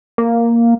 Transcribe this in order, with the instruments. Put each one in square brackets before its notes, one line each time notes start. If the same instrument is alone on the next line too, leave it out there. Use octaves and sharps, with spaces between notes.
[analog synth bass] A#3